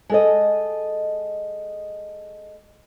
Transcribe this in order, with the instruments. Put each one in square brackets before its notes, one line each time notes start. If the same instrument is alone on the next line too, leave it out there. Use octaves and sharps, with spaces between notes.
[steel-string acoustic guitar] G#3 A4 D#5